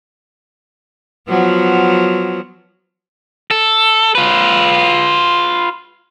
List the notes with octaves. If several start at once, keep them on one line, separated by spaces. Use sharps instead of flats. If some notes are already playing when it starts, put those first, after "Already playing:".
F3 F#3 B3
A4
F4 B4